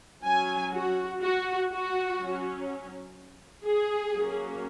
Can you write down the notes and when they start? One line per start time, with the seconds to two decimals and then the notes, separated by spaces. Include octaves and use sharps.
0.24 F#3 C#4 G#5
0.72 F#4
1.22 F#4
1.69 F#4
2.19 F#3 C#4
3.65 G#4
4.14 F#3 A#3 C#4